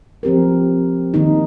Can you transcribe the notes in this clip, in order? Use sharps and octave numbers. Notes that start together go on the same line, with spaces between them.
F3 C4 G4 A#4
D#3 A#3 D#4